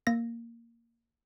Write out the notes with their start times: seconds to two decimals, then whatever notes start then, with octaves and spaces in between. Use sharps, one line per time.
0.07 A#3 A#6